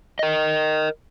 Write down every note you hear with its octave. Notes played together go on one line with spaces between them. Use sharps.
A#4 D#5